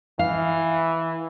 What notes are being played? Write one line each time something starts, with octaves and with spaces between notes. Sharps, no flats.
E3 F5